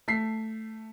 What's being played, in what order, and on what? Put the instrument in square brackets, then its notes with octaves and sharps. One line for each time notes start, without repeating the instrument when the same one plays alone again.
[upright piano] A3 B6 C7